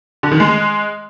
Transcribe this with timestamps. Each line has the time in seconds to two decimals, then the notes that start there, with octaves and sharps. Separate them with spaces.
0.23 D3
0.32 D#3
0.40 G#3